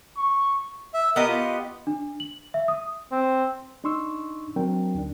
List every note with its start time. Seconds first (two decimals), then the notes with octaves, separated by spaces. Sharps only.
0.17 C#6
0.94 E5
1.16 B3 G4 A#4 D#5 D#6
1.28 F4
1.87 D4
2.20 F#7
2.54 E5
2.68 D#6
3.12 C4
3.84 D4 D#4 C6 C#6 E6
4.56 F#3 C4 D4 A#4 G5
4.95 D2 D4